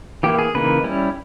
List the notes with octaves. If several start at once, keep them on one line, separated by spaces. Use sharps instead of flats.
E3 A#3 E4 G4
G#4
C#3 E3 A#3 D#4 B4
G3 C#4 E4